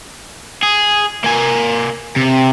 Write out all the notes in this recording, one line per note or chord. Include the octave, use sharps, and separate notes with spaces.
G#4
A#3 G#5
C3